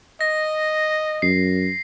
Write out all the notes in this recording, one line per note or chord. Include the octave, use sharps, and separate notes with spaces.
D#5 A#6
F#2 C7